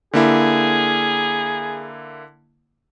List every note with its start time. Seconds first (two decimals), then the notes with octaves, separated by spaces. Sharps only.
0.13 D3 A#3 E4 G#4